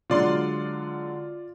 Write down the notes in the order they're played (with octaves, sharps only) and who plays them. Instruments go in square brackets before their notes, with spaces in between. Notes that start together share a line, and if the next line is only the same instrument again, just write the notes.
[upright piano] D3 F#3 G#3 [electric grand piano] F4 D5 C6